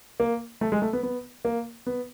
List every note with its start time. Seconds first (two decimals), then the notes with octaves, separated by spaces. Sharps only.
0.20 A#3
0.61 A3
0.72 G#3
0.82 A3
0.93 B3
1.03 B3
1.45 A#3
1.86 B3